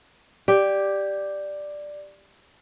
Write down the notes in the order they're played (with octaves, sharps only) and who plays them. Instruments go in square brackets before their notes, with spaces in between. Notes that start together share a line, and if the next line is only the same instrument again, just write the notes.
[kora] G4 [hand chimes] D5